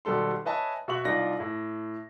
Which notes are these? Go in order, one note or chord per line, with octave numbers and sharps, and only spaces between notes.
G#1 B2 G3 A4 C6
B4 C#5 D#5 E5 G#5 A5
B2 F#4 E5 C#6 F#7
C2 D#4 F4 D5 A#6
A2